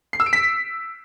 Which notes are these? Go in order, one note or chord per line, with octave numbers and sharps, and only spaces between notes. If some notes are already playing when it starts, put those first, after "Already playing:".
C7
E6
D7
B6